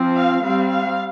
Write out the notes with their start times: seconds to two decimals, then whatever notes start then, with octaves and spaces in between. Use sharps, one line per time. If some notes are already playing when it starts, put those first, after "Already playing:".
Already playing: F3 C4
0.15 F5
0.43 G3 C4 F5
0.71 F5